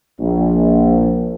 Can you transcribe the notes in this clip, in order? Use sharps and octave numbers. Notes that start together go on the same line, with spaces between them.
A#1